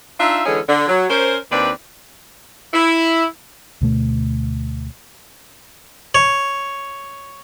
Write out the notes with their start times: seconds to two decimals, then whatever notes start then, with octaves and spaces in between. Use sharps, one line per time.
0.19 D4 D#4 F4 E5
0.45 D3 E3 G#3 C#4 G#4 A4
0.68 D3
0.88 F#3
1.08 C#4 A#4 C5
1.50 D#2 C4 D4 B4 D5
2.74 E4
3.82 D2 B2 A3
6.15 C#5